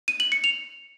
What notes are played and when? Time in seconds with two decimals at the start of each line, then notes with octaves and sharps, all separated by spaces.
0.08 D#7
0.20 F#7
0.32 C#7
0.44 F7